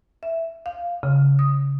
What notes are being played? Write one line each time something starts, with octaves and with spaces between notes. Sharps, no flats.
E5
F5
C#3
D#6